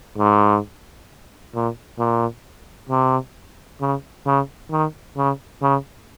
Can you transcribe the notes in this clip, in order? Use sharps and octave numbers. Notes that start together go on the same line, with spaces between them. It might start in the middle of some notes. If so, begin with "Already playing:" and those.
G#2
A#2
A#2
C3
C#3
C#3
D#3
C#3
C#3